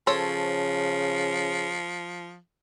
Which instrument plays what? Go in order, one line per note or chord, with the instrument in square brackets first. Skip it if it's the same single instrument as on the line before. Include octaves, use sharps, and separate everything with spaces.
[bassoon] C#3 [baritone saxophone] F3 [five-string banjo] A4 C5 C#5